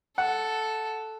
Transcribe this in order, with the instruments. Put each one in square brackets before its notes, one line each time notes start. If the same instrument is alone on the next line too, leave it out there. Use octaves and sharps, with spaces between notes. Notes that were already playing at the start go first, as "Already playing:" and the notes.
[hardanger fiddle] A4 [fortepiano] F#5